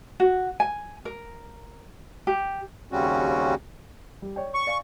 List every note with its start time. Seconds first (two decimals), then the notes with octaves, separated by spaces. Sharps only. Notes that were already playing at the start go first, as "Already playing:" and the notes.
0.20 F#4
0.60 G#5
1.05 A#4
2.27 G4
2.92 D#2 C#3 G3 C4 C#4 F#4
4.22 G3 G4
4.36 C#5 D5 G5
4.54 C#6
4.67 D5 F5 G#5